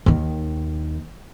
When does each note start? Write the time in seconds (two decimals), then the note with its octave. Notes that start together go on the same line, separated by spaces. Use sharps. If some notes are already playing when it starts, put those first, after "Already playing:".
0.06 D#2 D#3